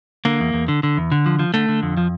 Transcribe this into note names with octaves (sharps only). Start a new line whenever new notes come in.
D3 A#3
E2
E2
D3
D3
E2
D3
F3
F3
D3 A3
D3
F2
F3